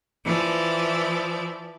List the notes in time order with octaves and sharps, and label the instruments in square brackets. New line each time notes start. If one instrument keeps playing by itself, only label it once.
[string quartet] E3 F3 D5